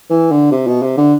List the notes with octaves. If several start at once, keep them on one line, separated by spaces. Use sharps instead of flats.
E3
D3
C3
B2
C3
D3